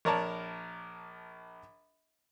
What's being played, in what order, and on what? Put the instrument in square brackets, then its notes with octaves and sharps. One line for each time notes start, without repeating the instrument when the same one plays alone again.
[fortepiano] A#1 A#4 C#5 D5 A5